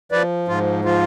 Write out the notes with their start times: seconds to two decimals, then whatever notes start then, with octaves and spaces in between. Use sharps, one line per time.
0.12 F3 B4 D5
0.48 G#2 F4
0.85 F3 F4